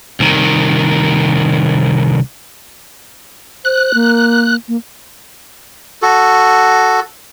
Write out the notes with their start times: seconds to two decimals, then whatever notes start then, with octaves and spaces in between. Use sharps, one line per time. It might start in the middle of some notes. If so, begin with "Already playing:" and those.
0.20 C2 D#3
3.65 C5 F#6
3.94 A#3
4.68 A#3
6.02 F#4 A4